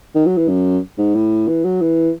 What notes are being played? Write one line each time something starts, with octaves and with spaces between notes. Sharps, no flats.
D#3
F#3
E3
F#2
G#2
A2
E3
F#3
E3